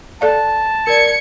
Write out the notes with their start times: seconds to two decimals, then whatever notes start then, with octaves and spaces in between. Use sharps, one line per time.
0.21 A4 D5 F5 A5
0.87 A#4 D5 G#6 C#7